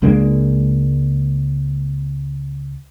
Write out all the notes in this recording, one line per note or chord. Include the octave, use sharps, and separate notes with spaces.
C#2 G#3 A#3 D4